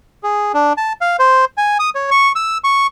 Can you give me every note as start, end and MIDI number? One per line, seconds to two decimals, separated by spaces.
0.23 0.52 68
0.54 0.73 62
0.77 0.93 81
1.01 1.17 77
1.19 1.45 72
1.57 1.78 80
1.79 1.90 87
1.95 2.10 73
2.11 2.32 85
2.36 2.58 88
2.64 2.87 85